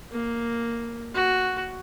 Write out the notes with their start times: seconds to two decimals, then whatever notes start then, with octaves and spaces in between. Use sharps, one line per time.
0.12 A#3
1.14 F#4